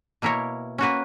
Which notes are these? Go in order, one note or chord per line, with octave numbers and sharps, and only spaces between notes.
B2 A#3 E4 A#4 C#5
A#3 C#4 F#4 B4